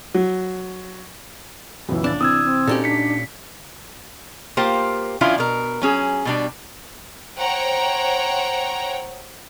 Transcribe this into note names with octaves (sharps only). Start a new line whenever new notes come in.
F#3
C#2 F#2 B2 E3
A#1 C#3 D4 A6
C3 E3 C4 D#6 E6 G#6
C4
A#2 C#4 D#4 F#4 G4 A4
D4 B6 C#7
A#3 F4 G4 C5
D#3 F3 C#4 D4 E4 F4
B2 A#4
F#3 C#4 G#4
B2 G3 D4
C5 C#5 F#5 G5 A#5